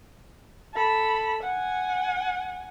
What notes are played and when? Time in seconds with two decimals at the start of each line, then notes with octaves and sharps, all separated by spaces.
0.74 A4 B5
1.43 F#5 G#5